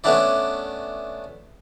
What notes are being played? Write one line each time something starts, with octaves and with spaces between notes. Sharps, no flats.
A3 B3 C#4 D4 E4 D5